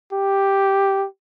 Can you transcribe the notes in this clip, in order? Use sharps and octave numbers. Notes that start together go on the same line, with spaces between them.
G4